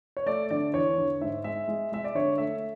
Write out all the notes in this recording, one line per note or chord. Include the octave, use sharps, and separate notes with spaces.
C#5
A3 D5
D3 D5
E2 C#5
D3
G#2 E5
G#3 E5
G#3
G#3 E5
D5
D3 C#5
A3 E5